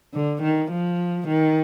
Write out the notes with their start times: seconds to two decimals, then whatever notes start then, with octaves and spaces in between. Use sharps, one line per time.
0.14 D3
0.42 D#3
0.71 F3
1.28 D#3